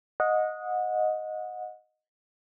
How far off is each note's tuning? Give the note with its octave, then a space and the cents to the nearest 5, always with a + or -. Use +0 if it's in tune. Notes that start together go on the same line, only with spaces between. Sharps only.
D#5 +0 F#5 -30